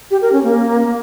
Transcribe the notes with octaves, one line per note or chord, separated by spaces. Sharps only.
G4
A#4
C#4
A#3